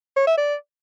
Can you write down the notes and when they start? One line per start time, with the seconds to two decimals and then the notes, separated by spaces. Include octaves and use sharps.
0.16 C#5
0.27 E5
0.38 D5